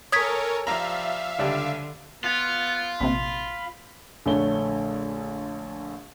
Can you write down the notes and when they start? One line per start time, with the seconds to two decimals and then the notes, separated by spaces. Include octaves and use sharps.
0.12 A4 A#4 C#5 G#5 D#6 G#6 B6
0.67 F3 G3 E5 F5 A#5
1.39 C#2 D3 G3 D4
2.24 B3 F4
3.00 A#1 C3 B5
4.26 A#1 D3 A3 C#5 G7